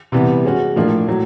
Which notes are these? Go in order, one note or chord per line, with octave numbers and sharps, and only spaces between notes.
C3 E3 G3 B3
G#3 C#4 F#4
A2 F3 A#3 D4
A2 F#3